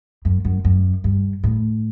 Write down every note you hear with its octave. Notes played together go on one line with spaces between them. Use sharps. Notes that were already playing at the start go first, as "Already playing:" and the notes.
F#2
F#2
F#2
G2
A2